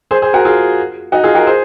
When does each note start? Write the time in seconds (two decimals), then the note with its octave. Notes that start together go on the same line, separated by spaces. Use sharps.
0.11 G#4 C5
0.22 G#4 C5
0.33 F#4 A#4
0.45 F4 G#4
1.12 D#4 F#4
1.24 F4 G#4
1.35 F#4 A#4
1.47 G#4 C5